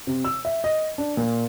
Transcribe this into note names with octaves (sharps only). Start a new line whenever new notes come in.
C3
E6
E5
D#5
D4
A#2